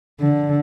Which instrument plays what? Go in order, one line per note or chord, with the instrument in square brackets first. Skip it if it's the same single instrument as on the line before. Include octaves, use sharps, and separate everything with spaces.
[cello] D3